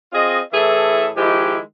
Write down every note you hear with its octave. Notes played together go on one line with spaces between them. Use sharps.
C4 F4 G#4 D#5
A2 E3 G#4 A4 E5
D#3 F3 G#3 E4 G4